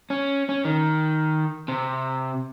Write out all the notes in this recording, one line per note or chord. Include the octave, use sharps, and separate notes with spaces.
C#4
C#4
D#3
C3